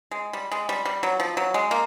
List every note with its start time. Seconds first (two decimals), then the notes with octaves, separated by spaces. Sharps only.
0.11 G#3
0.33 G3
0.52 G#3
0.69 G3
0.85 G3
1.03 F#3
1.20 F3
1.37 F#3
1.54 G#3
1.71 A#3